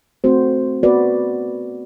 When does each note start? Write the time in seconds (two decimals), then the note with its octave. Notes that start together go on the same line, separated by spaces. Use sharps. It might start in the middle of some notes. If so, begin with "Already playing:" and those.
0.24 A3 C4 F#4 C5
0.83 B3 F#4 B4 D5